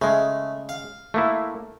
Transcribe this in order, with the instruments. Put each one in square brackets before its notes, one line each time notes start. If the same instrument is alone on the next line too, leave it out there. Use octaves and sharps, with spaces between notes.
[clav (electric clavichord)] C#3 G#3 [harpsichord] A3
[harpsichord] F5
[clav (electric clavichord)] A3 A#3 E4